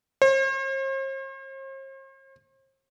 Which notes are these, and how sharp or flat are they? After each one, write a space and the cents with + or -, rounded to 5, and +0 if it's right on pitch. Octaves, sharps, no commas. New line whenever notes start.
C5 +45